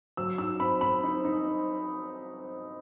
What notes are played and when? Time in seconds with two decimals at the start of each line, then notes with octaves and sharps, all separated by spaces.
0.17 F#3 E6
0.38 D#4 E6
0.60 C4 B5
0.81 C4 B5
1.03 D#4
1.25 D#4